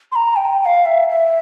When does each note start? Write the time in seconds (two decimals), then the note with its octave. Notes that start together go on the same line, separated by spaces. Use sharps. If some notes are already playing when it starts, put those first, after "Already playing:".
0.12 C6
0.16 A#5
0.36 G5
0.61 G5
0.65 F5
0.85 E5
1.09 E5